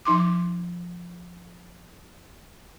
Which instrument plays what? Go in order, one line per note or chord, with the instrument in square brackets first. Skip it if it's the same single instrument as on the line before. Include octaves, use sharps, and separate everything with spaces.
[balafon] F3 D#4 C6 D6